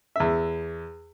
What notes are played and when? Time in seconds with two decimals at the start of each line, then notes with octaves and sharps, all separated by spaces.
0.16 E2 E5